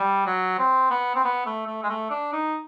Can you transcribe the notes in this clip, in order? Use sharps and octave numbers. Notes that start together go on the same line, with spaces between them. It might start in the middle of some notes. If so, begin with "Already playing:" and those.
Already playing: G3
F#3
C4
B3
C4
B3
A3
A3
G#3
A3
D4
D#4